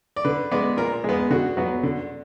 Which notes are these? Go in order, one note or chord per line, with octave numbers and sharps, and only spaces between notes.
D5
D3 B4
G#3 B3 D5
A#2 A#4
G#3 B3 G#4
D3 F#4
F#3 B3 F#4
D3